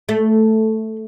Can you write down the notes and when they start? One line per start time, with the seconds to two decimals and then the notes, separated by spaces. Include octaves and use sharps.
0.09 A3